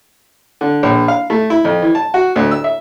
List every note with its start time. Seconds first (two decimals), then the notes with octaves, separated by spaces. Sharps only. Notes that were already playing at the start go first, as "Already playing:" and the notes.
0.61 D3
0.83 A#1
1.08 F5
1.30 A3
1.50 E4
1.65 F2
1.82 E3
1.95 A5
2.14 F#4
2.36 D2
2.51 E6
2.64 E5